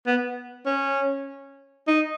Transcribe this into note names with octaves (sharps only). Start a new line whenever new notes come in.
B3
C#4
D#4